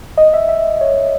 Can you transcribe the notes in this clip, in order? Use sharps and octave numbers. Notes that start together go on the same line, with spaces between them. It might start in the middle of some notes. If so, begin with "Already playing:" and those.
D#5
E5
E5
C#5